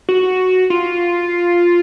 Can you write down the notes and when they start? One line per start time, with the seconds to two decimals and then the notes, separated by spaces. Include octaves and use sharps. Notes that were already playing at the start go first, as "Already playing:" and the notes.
0.09 F#4
0.70 F4